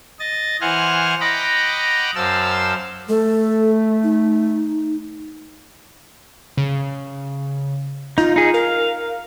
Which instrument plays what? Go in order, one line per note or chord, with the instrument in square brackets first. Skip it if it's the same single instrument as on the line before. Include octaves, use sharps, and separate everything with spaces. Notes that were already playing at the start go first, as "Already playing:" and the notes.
[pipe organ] D#5 A6
E3 C5 F#5 G#5 F6
D#5 F#5 G5 A#5 B5 D6
F#2 C5 F5 A5 E6
[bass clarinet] A3 [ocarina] A4
[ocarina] D#4
[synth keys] C#3
[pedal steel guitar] D#4 [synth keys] F4
[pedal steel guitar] D#4 G#4
[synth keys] A#4 [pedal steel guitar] F5